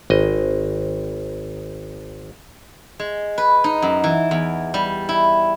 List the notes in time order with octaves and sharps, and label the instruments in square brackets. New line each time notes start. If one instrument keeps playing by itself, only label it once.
[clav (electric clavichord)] G#1 D#5
[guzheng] G#3
B4
D#4
F#2
E3
E2
G3
E4